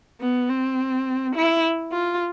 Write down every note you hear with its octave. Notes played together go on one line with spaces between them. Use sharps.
B3
C4
E4
F4